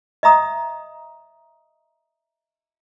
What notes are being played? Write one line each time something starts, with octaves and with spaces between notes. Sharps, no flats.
D#5 E5 A#5 D#6